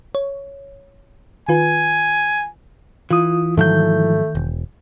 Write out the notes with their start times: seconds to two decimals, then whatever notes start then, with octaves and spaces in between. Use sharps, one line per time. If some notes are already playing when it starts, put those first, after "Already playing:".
0.15 C#5
1.49 D#3 F4 B4 G#5
3.11 E3 F4 D#6
3.57 G#2 D#3 F3 F#3 A3 G6
4.35 E1